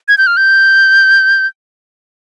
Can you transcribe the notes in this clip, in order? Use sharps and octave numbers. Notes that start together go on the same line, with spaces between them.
G#6
G6
F6
G6